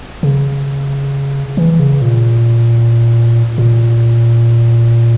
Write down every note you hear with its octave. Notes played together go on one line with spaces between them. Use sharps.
C#3
E3
C#3
A#2
A#2